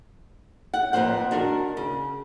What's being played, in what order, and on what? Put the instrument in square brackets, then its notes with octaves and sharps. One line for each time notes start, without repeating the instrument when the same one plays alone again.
[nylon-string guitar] F#5
F2 A#2 D#3 B4 C5 F#5
D#3 D4 F#4 A#4
C#3